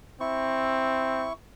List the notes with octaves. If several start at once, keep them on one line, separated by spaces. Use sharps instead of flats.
C4 E4 C#6